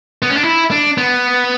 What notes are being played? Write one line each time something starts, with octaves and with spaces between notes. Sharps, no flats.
B3
C#4
D4
E4
D4
B3